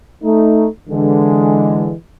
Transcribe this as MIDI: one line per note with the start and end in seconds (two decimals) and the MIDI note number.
0.23 0.66 57
0.23 0.66 63
0.90 1.93 50
0.90 1.93 52
0.90 1.93 56